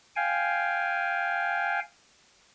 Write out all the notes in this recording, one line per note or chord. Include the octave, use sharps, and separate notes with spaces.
F5 G5 G#5